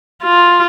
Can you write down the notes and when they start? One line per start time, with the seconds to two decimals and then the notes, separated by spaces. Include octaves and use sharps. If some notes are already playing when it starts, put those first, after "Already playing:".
0.24 F4